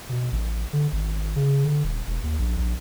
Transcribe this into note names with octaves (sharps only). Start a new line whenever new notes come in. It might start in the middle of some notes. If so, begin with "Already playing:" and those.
B2
A1
D3
G#1
C#3
D3
D#1
E1
D#2
A#1
A#1